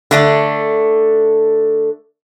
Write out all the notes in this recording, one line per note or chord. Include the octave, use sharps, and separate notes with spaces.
D3 A3 D4